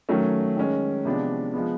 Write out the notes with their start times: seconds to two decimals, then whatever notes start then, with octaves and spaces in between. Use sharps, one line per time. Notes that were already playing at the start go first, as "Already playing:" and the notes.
0.09 D#3 F#3 A3 C#4
0.57 D#3 G#3 C#4
1.05 C3 F3 G#3 B3 D4
1.54 F3 G#3 B3